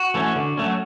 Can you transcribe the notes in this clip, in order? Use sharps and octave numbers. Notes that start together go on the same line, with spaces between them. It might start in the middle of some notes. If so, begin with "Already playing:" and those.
Already playing: F#4
E3 A3 C#4
D3
F#3 A3 C#4